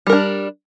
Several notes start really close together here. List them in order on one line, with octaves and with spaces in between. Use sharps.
G3 A#4 D4